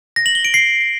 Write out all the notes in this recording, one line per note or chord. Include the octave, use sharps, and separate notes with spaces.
A#6
F#7
G7
D7
C7